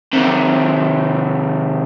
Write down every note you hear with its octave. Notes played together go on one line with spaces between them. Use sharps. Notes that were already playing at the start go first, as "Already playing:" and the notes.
C3 D#3